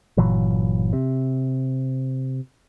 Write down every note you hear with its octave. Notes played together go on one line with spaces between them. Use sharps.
G1 A#2 E3 F#3
C3